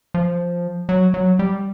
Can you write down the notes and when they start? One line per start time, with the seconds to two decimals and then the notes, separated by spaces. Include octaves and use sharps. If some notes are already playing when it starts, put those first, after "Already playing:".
0.14 F3
0.89 F#3
1.14 F#3
1.39 G3